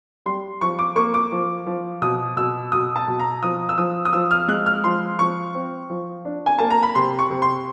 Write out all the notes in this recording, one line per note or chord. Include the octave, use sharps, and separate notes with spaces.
G3 C6
F3 C#6
D6
A#3 C#6
D6
F3
F3
B2 D#6
B2 E6
B2 D#6
A5
B2
A#5
F3 D#6
E6
F3 D#6
D#6
F3 E6
F6
G#3 F#6
F6
F3 C6
F3 C#6
C4
F3
D4
G#5
A#3 A5
A#5
B5
C3 C6
C#6
C3
C6